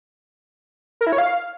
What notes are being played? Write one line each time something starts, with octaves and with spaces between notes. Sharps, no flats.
A#4
E4
C#5
F5